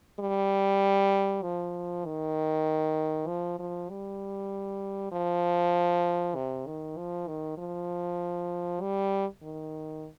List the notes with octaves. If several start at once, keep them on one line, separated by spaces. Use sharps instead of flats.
G3
F3
D#3
F3
F3
G3
F3
C3
D#3
F3
D#3
F3
G3
D#3